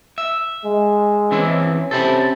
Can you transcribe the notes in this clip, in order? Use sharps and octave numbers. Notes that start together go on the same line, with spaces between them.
E5
G#3
E3 C4 C#4 E4
C3 A4 C5 B5